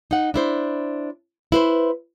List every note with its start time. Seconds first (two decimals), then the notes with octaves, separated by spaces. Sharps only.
0.11 D#4 F#5
0.34 D4 E4 C5
1.52 E4 B4 C5